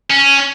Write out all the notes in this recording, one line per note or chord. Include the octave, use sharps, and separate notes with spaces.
C#4